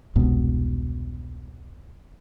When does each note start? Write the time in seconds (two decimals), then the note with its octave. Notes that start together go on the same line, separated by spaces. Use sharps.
0.15 E1 C2 G#2 B2